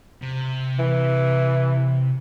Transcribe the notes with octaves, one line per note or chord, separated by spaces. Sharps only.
C3
E3